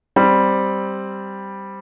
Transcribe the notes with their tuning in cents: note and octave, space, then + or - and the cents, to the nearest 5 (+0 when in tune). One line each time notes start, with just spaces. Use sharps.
G3 +0 C4 +0